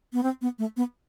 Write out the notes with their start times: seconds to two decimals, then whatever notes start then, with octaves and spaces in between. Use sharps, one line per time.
0.13 B3
0.23 C4
0.41 B3
0.59 A3
0.77 B3